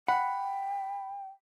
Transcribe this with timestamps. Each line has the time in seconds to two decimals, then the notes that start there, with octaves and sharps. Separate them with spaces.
0.08 F#5 G5 B5